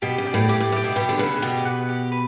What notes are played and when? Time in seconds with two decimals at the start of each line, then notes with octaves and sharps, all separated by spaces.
0.02 B2 G4
0.18 C#3
0.25 D5 G5
0.34 A2
0.49 A2 G4
0.60 A2
0.72 A2 D5 G5
0.84 B2
0.96 B2 G4
1.09 D3
1.19 C#3 B4 F#5
1.42 B2 G4
1.65 B4 F#5
1.89 G4
2.12 B4